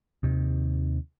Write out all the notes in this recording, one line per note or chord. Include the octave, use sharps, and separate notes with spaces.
D#2 C3 D#3